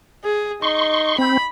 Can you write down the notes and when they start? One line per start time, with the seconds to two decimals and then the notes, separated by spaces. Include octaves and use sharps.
0.24 G#4
0.62 D#4 C6 C#6
1.19 C4 B5